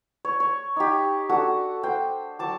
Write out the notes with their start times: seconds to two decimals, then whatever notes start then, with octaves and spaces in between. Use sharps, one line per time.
0.25 C#5
0.40 C#5
0.76 D#4 G4
1.29 D4 F#4 A4
1.83 C5 G5
2.39 F#3 A5 D6